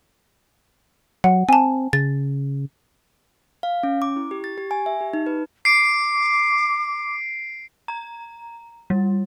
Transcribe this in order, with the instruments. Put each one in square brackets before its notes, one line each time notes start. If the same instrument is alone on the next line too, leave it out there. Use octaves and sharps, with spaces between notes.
[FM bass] F#3 [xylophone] F#5
[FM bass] C4 [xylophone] G#5 A5
[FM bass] C#3 [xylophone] A6
[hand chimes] F5
C#4
D6
E4
G4
A6
G4
G#5
E5
G4
D#4
B4
[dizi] D6 [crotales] C7 D7
[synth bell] A#5
G3